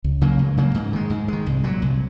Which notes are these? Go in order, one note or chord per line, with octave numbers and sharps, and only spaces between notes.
C#2
C#3 F#3 A#3
C#2
C#3 F#3 A#3
G#2
D#3 G#3
G#2
D#3 G#3
C2
A#2 F#3
C2